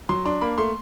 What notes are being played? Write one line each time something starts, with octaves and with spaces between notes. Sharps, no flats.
F#3 C6
D4 C6
A#3 B5
A3 C6